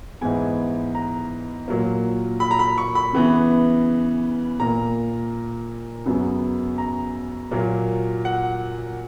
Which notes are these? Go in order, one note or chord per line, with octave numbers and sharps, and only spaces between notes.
G#2 E3 B3 G#5
A#5
A#2 F#3 A#3
B5
A#5
B5
C#6
B5
C#3 E3 B3
A#2 A#3 A#5
F#2 C#3 F#3 B3
A#5
A#2 F#3 A#3
F#5